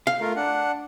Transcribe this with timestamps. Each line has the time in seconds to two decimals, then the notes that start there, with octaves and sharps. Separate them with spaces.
0.07 F5
0.20 A3 F4 A#4
0.36 D4 F#5